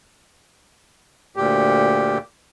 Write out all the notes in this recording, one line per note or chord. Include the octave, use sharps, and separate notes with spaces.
D2 A#2 G4